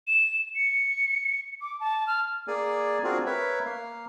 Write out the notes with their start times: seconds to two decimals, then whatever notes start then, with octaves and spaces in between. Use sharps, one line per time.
0.08 E7
0.56 C#7
1.61 D6
1.80 A5
2.07 F6
2.48 A#3 G#4 D5 G#5
3.04 C4 D4 F4 F#4 G#4 A#4
3.26 A#4 B4 C#5 E5
3.65 A#3 F5